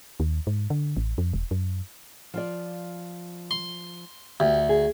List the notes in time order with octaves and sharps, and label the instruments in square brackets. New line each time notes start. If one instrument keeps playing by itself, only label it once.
[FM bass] D#2
G#2
D3
A1
F2
E1
F#2
[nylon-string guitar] F3 F4 D5
[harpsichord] C6
[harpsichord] D2 [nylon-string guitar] G4
[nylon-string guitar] G#4